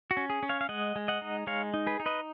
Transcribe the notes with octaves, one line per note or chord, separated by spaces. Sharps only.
F#4
C#4
G#4
C#4
C#5 F5
F5
G#3 D#5 F#5
G#3
D#5 F#5
D#4
G#3 C#5 F5
D#4
G#4 B4
D#4
B4 D#5